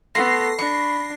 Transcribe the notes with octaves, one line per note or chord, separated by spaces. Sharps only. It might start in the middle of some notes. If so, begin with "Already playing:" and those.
A3 B3 A4 C6 A#6 C7
D4 B5 C#6